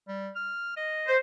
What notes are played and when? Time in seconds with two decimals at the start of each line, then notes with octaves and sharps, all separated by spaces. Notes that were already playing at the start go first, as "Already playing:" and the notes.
0.08 G3
0.36 F6
0.77 D#5
1.07 C5